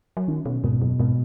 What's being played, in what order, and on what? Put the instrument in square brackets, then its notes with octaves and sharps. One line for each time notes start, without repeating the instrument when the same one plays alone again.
[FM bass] F#3
[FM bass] D#3 [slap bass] C#4
[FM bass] B2
[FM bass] G#2 [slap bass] B2
[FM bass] F#2
[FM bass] G#2 [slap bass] B2